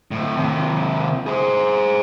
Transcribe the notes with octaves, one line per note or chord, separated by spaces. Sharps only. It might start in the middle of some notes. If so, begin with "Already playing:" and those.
D2 A2
D#2 C3
G#4 C5